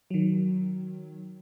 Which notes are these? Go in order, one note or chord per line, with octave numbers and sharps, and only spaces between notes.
D#3 F#3